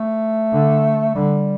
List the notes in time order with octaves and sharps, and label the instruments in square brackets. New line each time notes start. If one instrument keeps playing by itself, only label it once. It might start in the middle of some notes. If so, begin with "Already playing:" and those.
Already playing: [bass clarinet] A3
[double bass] D3
[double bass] D3 [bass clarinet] G3